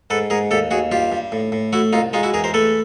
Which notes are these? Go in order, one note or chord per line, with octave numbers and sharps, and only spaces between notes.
G#2 A4 B4
G#2 G#4 A#4
D#2 G4 A4
D#2 F#4 G#4
G2 F4 G4
G2
A2
A2
A3 E4 F#4
C2 D#4 F4
G#3 D#4 F4
E4 F#4
E2 G#4 A#4
A#4 C5
A3 A4 B4